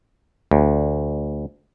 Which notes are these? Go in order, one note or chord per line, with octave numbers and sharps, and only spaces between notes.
D2